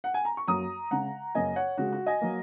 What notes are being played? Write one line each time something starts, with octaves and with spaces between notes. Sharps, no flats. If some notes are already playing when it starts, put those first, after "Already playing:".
F#5
G#5
A#5
C#6
F#2 F#3 A#3 A#5 D#6
C#3 G#3 F#5 A#5
F#2 C#3 F#3 A#3 D#5 G#5
C#5 F#5
C#3 G#3 F#4
F#4
D#5 G#5
F#3 A#3